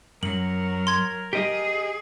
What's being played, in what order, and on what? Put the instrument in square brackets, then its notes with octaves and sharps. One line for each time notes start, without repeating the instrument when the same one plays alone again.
[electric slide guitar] F#2 [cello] F#3 [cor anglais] A#4 [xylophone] F#7
[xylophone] C6 G#6
[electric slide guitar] G4 D#5 [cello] G#4